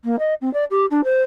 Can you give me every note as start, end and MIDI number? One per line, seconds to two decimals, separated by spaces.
0.04 0.16 58
0.19 0.34 75
0.41 0.52 60
0.53 0.64 74
0.70 0.85 67
0.90 1.01 62
1.04 1.22 72